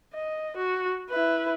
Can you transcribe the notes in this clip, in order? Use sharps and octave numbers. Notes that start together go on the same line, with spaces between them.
D#5
F#4
E4 B4